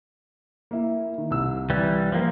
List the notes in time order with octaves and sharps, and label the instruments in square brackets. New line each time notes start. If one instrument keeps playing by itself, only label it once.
[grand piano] A#3 E4
D#3
C2 E6
[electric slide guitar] E3 G3
F3 A#3